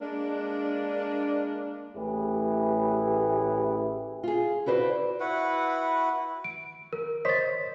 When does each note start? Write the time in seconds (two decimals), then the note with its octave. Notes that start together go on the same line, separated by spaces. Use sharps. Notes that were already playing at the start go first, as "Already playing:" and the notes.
0.01 G#3 A#3 D4
1.94 A1 A2 E4 G4 G#4 B4
4.24 F4 G#4
4.66 E4 F#4 B4 C5 D5
5.20 E4 F#4 B4 F#5
6.44 D7
6.93 A#4
7.25 C5 C#5 D#5 A6 B6